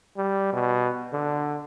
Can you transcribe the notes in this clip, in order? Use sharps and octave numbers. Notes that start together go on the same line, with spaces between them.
G3
B2
D3